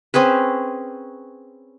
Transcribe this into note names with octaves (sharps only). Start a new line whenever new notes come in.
C4 C#4 G#4 B4